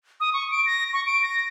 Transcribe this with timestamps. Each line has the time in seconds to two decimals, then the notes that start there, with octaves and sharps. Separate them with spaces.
0.20 D#6
0.33 C#6
0.51 D7
0.66 A#6
0.93 C#6
1.06 D7
1.23 A#6